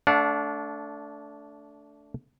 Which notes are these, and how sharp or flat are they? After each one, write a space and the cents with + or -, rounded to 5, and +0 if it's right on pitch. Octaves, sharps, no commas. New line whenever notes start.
A3 +0 D4 -20 F#5 -45